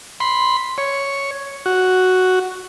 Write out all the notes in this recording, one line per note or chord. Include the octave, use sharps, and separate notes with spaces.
B5 C6
C#5
F#4